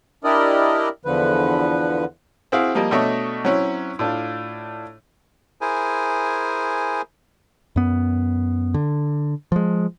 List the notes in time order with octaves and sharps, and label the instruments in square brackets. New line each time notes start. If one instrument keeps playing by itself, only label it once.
[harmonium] D4 E4 G4 A#4 D5 D#5
E2 D3 F3 B4
[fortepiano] C4 E4 F#4 G#4 F5
F3 G3 A#3 D#5
B2 A3 D4 C#5 D#5 E5
F#3 C4 C#4 E4
A2 D4 F4
[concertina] E4 G#4 A#4 C5 G#5
[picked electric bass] F#2 B3
D3
F3 G#3